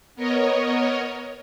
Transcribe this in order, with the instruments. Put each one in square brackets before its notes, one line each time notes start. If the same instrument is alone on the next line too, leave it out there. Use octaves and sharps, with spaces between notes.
[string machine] B3 A#4 C#5 D#5